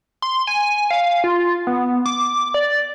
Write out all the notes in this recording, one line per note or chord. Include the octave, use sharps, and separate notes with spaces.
C6
G#5
F5
F4
B3
D6
D5